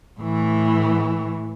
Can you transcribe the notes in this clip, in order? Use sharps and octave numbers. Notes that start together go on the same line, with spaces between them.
A2 E3